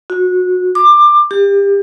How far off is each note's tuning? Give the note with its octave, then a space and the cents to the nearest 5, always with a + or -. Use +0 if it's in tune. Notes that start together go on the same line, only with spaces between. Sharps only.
F#4 -25
D6 +20
G4 +30